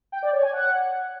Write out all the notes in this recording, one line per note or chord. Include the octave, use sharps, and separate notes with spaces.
G5
D5
C#5
G#5
F#5